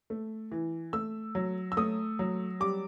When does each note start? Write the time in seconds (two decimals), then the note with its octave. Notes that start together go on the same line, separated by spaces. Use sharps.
0.10 A3
0.52 E3
0.93 A3 E6
1.35 F#3
1.72 E6
1.77 A3 D#6
2.19 F#3
2.60 G3 D6